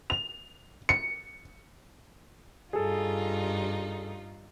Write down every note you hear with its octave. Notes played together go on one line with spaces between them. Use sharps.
F7
C#7
G2 D#4 F4 G#4 A4